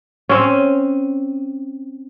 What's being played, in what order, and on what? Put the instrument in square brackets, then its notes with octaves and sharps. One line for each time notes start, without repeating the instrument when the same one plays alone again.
[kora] C4 C#4